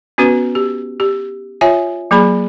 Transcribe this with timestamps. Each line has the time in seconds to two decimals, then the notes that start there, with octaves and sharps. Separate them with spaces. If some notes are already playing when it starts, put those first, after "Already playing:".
0.18 B3 C#4 F#4 B4
0.55 G4
1.00 G4
1.61 F4 C#5 E5 G#5
2.11 F#3 A#3 G#4 B5